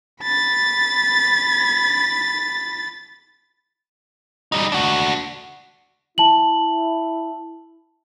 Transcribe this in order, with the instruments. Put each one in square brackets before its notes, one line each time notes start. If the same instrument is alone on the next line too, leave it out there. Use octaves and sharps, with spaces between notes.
[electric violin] B5 A6
[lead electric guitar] G3 D#4
D4 F#4
[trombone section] E4 [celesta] A5 F#7